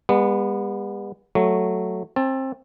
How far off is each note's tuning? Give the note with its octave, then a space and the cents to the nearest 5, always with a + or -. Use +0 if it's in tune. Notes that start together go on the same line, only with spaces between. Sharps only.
G3 +45 B3 -20
F#3 +0 A3 +0
C4 +25 A5 +0